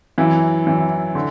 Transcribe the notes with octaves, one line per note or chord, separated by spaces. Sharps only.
F#2 E3 E4
F#2 E3
D3